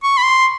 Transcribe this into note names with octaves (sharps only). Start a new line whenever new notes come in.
C#6
B5
C6